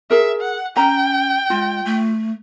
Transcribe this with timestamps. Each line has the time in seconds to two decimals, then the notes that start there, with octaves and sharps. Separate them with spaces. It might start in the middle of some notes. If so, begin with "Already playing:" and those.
0.10 G#4 A#4 E5
0.41 F#5
0.77 C#4 G5 A#5
1.50 G#3 F4
1.85 A3